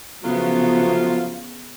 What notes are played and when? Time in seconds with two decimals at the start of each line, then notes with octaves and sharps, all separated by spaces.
0.23 C#3 F3 F#3 A3 B3 F4